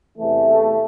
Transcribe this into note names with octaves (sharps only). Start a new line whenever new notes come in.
E2 C3 E3 A3